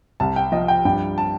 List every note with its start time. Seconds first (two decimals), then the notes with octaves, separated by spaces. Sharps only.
0.20 C2 A5
0.36 G5
0.52 F3 D#5
0.68 G5
0.85 G2 G5
1.18 A5